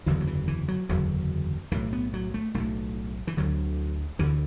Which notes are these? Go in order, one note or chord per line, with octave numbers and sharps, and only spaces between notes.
F#1 E2 D3 E3
F#3
E3
E3
F#3
F#1 E2 D3 F#3
B1 A2 E3
B3
F#3
A3
B1 A2 A3
E3
D2 D3 F#3
D2 D3 E3